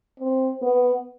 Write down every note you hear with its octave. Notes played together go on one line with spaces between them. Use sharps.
C4
B3